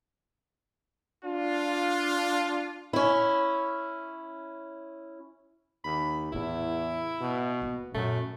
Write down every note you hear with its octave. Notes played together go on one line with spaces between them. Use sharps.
D4 F4
C#4 E4
D#2 B5
E2 A2 C#3 E4
B2
A#3 B3
F#2 A#2 A3